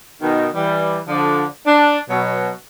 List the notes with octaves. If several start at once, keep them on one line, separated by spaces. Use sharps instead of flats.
B2 D#3 D#4
E3 G3
D3 F3 D4
D4
B2 F#3